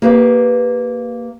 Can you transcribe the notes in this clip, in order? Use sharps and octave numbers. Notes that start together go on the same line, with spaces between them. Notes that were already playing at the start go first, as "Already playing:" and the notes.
A#3 G4 B4 F5